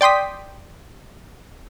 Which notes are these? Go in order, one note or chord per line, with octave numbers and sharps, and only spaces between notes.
D5 G5 C6 D#6 B6